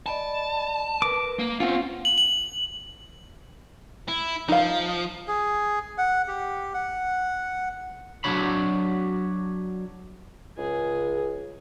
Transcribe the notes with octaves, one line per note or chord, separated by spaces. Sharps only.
D5 D#5 A5 B5
A#4 B4 D6
A#3
C4 C#4 F4 F#5
F#7
F#7
E4
F3 D#4 F5
G#4
F#5
G4
F#5
F#3 D4 F#4 C#5 B5
C#2 G#4